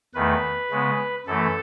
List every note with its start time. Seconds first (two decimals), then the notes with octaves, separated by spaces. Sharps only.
0.14 E2 D#3 A3 B4
0.71 C#3 G#3 B3
1.27 F#2 E3 A3 A4